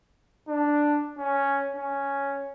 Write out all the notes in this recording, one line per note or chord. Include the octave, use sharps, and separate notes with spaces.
D4
C#4
C#4